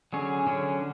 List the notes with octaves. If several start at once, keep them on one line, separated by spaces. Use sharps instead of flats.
D3 F#3 C#4 G#4
D3 F#3 C#4 G#4